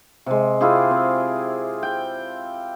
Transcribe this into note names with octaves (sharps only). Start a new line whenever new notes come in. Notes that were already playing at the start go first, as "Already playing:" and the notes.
C3 G#3
E4 F4 G4 G#4
C4
G5